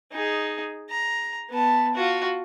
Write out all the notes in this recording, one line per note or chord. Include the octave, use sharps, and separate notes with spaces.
D#4 G#4
A#5
B3 A5
F4 F#4